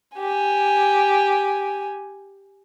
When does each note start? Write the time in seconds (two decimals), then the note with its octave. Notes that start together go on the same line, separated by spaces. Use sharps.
0.17 G4 G#5